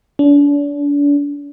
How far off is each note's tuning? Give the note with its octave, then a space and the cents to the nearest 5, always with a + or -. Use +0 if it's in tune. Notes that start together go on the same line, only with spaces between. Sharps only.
D4 -40